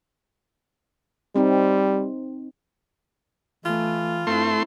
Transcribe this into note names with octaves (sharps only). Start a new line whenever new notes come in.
G3 C4 D#4
E3 A3 F4
G2 A3 C4 E4 C6